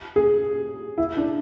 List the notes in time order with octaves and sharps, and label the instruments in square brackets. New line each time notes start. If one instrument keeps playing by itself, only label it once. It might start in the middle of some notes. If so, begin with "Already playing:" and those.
[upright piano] G#4
E4
D4